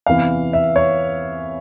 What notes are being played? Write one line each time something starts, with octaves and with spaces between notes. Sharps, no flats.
E2 C3 E3 F5
E5
C#5